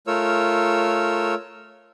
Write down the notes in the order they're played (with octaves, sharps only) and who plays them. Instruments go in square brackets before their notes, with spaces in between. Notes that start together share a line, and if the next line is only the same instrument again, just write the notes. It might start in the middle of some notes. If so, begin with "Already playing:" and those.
[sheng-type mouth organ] A3 F4 A#4 C#5 E6